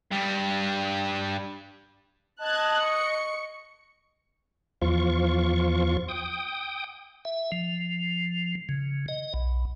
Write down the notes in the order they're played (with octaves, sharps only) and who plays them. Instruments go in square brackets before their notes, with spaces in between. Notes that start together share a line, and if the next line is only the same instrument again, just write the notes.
[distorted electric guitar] G2 G3
[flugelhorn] D#5 [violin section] A5 F#6 G#6
[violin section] C#6 C#7
[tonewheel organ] E2 F3 F4 C#6
G5 D#6
E5
F3
C#3
D#5
B1